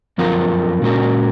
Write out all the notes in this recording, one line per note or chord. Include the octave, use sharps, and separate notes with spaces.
F#2 F3 C4 F4 A#4
A#2 G#3 C#4 F#4 A#4